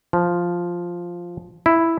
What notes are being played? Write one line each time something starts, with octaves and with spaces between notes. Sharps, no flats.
F3
E4